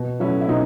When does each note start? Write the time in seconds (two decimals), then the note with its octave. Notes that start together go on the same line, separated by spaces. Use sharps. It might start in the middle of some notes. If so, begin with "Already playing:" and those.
Already playing: B2
0.20 F#3 A3 C#4 E4
0.41 E4
0.48 B2 D#4